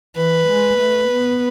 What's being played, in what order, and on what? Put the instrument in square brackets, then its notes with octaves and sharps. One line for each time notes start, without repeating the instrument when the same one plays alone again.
[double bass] E3 [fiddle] B4
[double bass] G#3
A3
B3